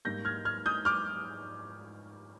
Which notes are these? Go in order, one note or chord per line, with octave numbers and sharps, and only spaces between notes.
G#2 G3 A#3 G6 A#6
F6 G#6
F6 G#6
D#6 G6
D6 F6